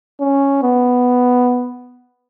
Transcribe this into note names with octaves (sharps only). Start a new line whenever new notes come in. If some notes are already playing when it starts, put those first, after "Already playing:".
C#4
B3